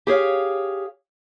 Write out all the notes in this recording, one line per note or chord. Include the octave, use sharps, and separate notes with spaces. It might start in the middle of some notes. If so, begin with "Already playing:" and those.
G4 G#4 C#5 F5